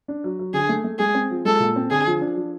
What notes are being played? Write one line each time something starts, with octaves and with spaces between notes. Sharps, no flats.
D4
F#3
F#3
D3 G#4
A3
A3
G#3 G#4
C4
F3
G#3 A4
A#2
C4
D3 G#4
F3
D4
F3